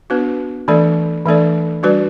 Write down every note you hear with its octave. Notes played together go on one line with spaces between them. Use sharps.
B3 D4 F#4 B4
E3 A3 D4 A4 D5
E3 A3 D4 A4 D5
G3 D4 F#4 B4 D5